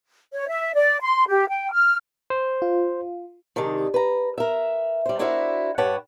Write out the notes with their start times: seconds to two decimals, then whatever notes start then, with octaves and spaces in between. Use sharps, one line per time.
0.34 C#5
0.49 E5
0.74 D5
1.02 C6
1.28 G4
1.49 G5
1.72 F6
2.30 C5
2.62 F4
3.56 C3 D#3 G#3 D4 D#4
3.94 B4 A#5
4.38 A#4 E5
5.06 G3 C5
5.19 D4 E4 F#4 A#4 C5 E5
5.78 G2 G4 B4 C#5 F#5 A5